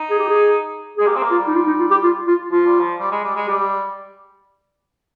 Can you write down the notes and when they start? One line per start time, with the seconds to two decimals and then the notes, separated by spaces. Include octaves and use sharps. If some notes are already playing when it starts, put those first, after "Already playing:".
Already playing: D#4
0.10 G#4
0.19 G4
0.28 G#4
0.98 G#3 G#4
1.07 A#3 G4
1.16 C4
1.23 A#3
1.31 F4
1.39 G3
1.47 D#4
1.55 F4
1.67 D#4
1.80 F4
1.91 G4
2.03 F4
2.27 F4
2.51 F3 F4
2.66 G3
2.80 F3
3.00 G3
3.12 G#3
3.24 G3
3.36 G#3
3.48 G3 G4